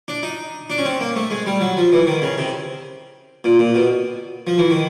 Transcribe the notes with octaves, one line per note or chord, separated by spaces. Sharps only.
D4
D#4
D4
C#4
C4
A#3
A3
G#3
G3
F#3
F3
E3
D#3
C#3
C3
A#2
A#2
B2
F3
E3
D#3